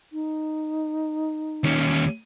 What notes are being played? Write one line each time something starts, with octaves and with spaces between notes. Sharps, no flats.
D#4
D#2 C#4